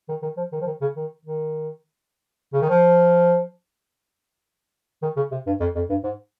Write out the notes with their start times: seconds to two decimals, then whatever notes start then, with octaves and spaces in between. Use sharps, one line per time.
0.09 D#3
0.22 D#3
0.37 F3
0.52 D#3
0.61 F3
0.66 D#3
0.81 C#3
0.96 D#3
1.25 D#3
2.53 C#3
2.62 D#3
2.69 F3
5.02 D#3
5.16 C#3
5.31 C3
5.46 G2
5.60 F2
5.75 F2
5.89 G2
6.04 G#2